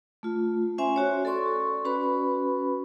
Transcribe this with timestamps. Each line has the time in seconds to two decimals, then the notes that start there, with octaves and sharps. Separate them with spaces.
0.23 A3 F4
0.78 C#4 C5 E5 G#5 C6
0.96 F#4 C#5
1.25 A4 D5 C6 C#6
1.85 C#4 F#4 B4 B5